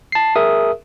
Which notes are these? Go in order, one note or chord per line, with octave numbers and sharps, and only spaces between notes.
A5 C7
G#4 A#4 E5 D#6